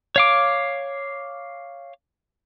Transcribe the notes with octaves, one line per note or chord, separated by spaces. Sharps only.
C#5 F5 D6